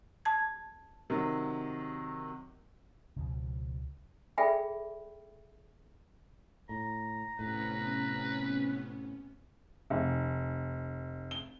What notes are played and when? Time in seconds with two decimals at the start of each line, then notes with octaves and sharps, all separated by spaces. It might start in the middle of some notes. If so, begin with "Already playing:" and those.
0.25 A5 G#6
1.10 C3 D#3 F#3
3.16 C#2 B2 F3
4.38 G#4 A4 D5 E5 G5 B5
6.69 A2 A#5
7.39 A2 C3 B3 C#4 B4
9.90 F1
11.31 G7